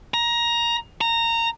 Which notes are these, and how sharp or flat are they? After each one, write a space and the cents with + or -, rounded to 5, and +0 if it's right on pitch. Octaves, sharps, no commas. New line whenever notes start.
A#5 +15
A#5 -15